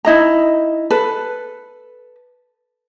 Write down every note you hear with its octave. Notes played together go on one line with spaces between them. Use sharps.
D#4 E4 D#5 A#5
A4 B4